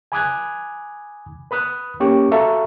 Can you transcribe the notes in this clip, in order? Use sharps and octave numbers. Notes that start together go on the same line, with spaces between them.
G#5 B5 D6 D#6 F#6 G#6
B4 B5 D#6 F#6
A#3 C#4 G4 C#6 D6
F#4 A4 E5 F5 A#5 C#6